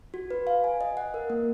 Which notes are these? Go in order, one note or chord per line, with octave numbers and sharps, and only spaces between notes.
F#4
B4
F5
G#5
D#5
F#5
A#4
A#3